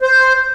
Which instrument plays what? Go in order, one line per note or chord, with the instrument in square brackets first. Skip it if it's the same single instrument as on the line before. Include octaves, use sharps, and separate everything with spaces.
[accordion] C5